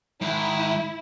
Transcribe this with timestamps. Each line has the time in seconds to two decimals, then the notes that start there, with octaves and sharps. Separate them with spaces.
0.22 G#2 D#3 E4